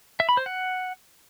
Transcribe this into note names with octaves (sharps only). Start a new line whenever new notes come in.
E5
B5
C5
F#5